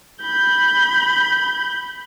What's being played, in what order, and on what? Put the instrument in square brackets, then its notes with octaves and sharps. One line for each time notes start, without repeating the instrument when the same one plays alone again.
[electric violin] B5 G6